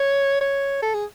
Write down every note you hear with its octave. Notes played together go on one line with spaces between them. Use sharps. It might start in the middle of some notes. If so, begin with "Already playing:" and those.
Already playing: C#5
C#5
A4
G#4